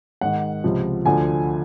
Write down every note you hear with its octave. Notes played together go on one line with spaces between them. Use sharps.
G#2 D#3 F#5
C#2 C3 F3
D2 D3 F3 G#5